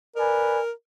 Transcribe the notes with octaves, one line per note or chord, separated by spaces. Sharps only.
A#4 B4 D5 G#5